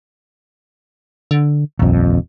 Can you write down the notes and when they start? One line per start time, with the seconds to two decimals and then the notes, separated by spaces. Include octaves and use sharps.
1.31 D3
1.79 D#1 A#1 F2